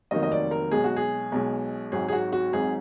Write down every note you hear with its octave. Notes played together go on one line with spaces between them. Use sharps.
F1 F2 D#3 F#3 A#3 D#5
D#5
D5
A#4
B1 B2 G#3 G#4
F#4
G#4
B1 B2 G#3
G#1 G#2 F#3 G#4
G#4
F#4
F#4
G#1 G#2 F#3 G#4